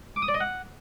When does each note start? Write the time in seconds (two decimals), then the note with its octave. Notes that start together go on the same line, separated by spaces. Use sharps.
0.16 D6
0.22 D#6
0.28 D5
0.34 D#5
0.40 F#5